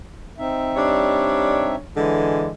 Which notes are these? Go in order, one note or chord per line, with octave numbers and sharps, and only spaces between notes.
C4 D#4 E5
G3 D4 C#5
D3 E3 G#3